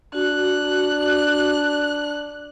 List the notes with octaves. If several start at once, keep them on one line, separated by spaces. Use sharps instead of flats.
D4 F#4 F#6